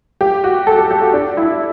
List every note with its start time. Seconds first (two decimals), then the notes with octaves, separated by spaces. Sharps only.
0.21 G4
0.44 F#4
0.67 A4
0.78 G4
0.90 G4
1.02 F#4
1.13 D4
1.37 E4